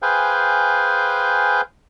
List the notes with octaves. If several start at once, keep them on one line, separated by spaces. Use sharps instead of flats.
G#4 B4 C5 F5 G5 G#5